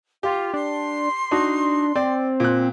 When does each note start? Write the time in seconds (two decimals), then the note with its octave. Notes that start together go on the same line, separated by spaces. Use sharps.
0.23 F4 G4
0.54 D4 C6
1.31 D4 D#4 F#4
1.96 C4 D5
2.40 A#2 F#6